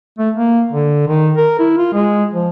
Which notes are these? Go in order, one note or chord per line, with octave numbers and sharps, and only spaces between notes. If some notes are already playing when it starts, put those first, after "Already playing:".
A3
A#3
D3
D#3
A#4
E4
F4
G#3
F3